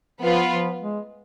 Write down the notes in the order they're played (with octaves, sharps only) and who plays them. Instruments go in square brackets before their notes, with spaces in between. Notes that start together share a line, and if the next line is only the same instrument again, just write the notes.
[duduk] F3 [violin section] B3 F4 B4
[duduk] F3
G#3